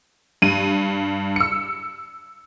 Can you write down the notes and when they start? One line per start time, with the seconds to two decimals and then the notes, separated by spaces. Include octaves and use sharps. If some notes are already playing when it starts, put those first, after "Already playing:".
0.42 G2 D#7
1.36 E6 C#7